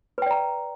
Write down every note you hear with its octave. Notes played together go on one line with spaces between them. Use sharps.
B4 D5 G5 A#5